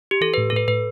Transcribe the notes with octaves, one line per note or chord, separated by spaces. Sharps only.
G4
E3 A4
A2 B4
A4
A2 B4
A2 B4